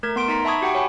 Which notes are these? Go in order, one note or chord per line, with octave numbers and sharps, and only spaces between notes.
A3 A#4 G#6
B3 C6 D7
D#4 A#5 B6
E5 A5 B5 C#6 D#6 G#6
F#4 G4 F#5 G5 C#6
C#5 G5 G#5 B5